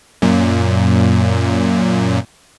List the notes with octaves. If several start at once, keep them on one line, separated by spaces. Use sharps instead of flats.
F#2 A#2